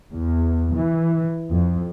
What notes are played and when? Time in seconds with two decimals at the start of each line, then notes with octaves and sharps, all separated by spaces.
0.14 E2
0.74 E3
1.51 F2